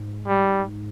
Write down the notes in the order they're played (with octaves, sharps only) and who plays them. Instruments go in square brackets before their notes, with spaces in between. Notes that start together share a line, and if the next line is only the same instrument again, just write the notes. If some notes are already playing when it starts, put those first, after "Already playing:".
Already playing: [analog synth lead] G#2
[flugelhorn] G3